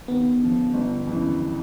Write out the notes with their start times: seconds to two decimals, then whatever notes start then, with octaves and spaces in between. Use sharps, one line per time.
0.08 D#2 B3
0.41 D3 F3
0.74 G1
1.07 F2 C#3 E3